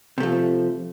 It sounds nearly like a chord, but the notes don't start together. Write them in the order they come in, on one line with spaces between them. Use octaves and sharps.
C3 A3 F3